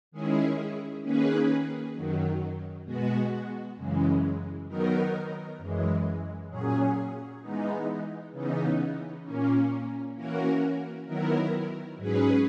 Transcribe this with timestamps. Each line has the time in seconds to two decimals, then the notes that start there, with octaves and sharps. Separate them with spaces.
0.11 D#3 G#3 C#4 E4 G#4
1.02 D#3 A#3 C#4 G#4 B4
1.93 F#2 D#3 F#3
2.85 B2 G#3 B3 F#4
3.77 F#2 C#3 E3 G#3
4.67 D#3 F#3 B3 D#4 A#4
5.58 F#2 E3 G#3
6.50 A#2 F#3 C#4 G#4
7.41 E3 G#3 B3 D#4
8.32 C#3 E3 B3 D#4
9.23 A#2 A#3 C#4
10.15 E3 A#3 C#4 F#4 A#4
11.06 D#3 F#3 B3 E4 A#4
11.97 G#2 F#3 C#4 G#4 B4